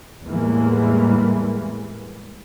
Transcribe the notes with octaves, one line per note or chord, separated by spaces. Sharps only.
E2 A2 E3 G3 G#3 A#3